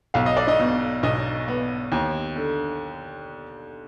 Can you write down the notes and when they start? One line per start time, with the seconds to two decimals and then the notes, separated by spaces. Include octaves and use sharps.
0.14 B1 F5
0.26 D#5
0.37 D5
0.47 D#4 D#5
0.60 B2
1.03 B1 D#4 D#5
1.48 B3
1.92 D#2
2.36 D3